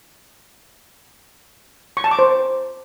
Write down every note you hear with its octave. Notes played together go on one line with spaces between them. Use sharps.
C#6
A5
D6
C5